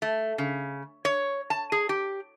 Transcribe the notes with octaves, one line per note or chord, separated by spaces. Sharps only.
A3
C#3
C#5
A5
G#4
G4